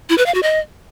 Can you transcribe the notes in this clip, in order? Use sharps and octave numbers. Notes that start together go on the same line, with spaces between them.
E4
B4
F5
F#4
D#5